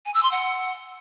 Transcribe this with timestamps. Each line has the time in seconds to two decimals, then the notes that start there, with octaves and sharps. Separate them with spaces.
0.05 G#5
0.14 E6
0.23 C6
0.31 F#5